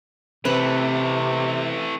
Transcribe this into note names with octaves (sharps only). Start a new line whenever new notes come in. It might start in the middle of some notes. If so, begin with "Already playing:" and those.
C3 E3 A3 C4 B4